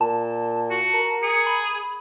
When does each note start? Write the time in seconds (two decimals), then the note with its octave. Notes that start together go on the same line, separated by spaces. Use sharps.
0.01 A#2 A5
0.70 F#4
0.94 A#4
1.23 G#4 C#7
1.47 B5